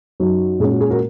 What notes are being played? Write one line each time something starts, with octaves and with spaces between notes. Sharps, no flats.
F#2 F#3 D#4
A#2 G#3 C#4 G#4
F#4
G#4
F#4 A#4